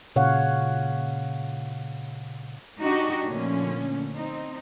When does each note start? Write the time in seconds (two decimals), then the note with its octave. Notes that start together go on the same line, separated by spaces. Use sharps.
0.16 A#2 C#3 C#5 F5 F#5
2.80 D4 D#4 F#4 G4 D#5
3.26 A#2 D3 F3 A3 C#4
4.14 C4 D#4